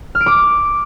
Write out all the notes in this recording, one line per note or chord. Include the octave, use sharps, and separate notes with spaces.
F6
D7
D6